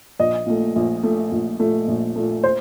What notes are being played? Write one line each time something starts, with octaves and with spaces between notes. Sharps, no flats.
A#1 D#5
A#2 A3
A#1
A#2 A3
A#1
A#2 A3
A#1
A#2 A3
C5